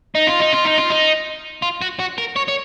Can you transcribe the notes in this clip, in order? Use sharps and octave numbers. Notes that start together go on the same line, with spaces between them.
D#4
F4
D#4
F4
D#4
F4
D#4
F4
F#4
F#4
A#4
C#5
C#5